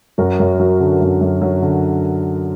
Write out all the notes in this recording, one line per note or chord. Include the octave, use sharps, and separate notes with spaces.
F#2 F#4 A#4
F#2
F#3
D3
F#2
F#2
F#3
D3